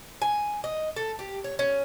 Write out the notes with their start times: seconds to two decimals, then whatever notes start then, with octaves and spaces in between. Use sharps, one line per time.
0.22 G#5
0.64 D#5
0.96 A4
1.19 G4
1.44 C#5
1.59 C#4